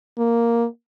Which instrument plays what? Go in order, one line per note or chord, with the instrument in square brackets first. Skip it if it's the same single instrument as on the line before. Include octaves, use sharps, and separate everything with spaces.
[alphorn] A#3